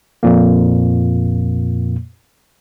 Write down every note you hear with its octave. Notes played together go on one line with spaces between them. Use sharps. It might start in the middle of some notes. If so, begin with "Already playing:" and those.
F2 A#2 A#3